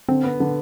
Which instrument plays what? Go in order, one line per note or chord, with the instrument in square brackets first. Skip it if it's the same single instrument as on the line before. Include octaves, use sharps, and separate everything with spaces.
[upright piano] D3 [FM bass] C4
[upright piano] B3
D3